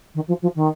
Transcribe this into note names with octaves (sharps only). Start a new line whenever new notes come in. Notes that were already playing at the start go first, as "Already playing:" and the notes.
D#3
F3
F3
D#3